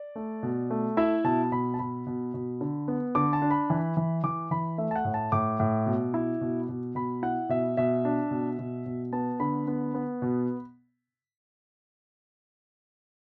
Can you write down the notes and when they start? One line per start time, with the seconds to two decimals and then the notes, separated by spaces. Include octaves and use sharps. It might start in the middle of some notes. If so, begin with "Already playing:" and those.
Already playing: D5
0.16 A3
0.43 B2
0.70 A3
0.97 E4 E5
1.24 B2 A5
1.52 B2 B5
1.74 A5
1.79 B2 B5
2.07 B2
2.34 B2
2.61 D3
2.88 B3
3.15 D3 D6
3.33 A5
3.42 D4
3.51 B5
3.70 E3
3.97 E3
4.24 E3 D6
4.51 E3 B5
4.78 A3 E5
4.91 A5
4.96 F#5
5.05 A2
5.14 A5
5.32 A2 D6
5.60 A2
5.86 B2
6.14 E4
6.41 B2
6.69 B2
6.95 B2 B5
7.22 E4 F#5
7.49 B2 E5
7.77 B2 E5
8.05 D4
8.31 B2
8.59 B2
8.86 B2
9.12 B3 A5
9.40 D3 B5
9.67 B3
9.94 B3
10.22 B2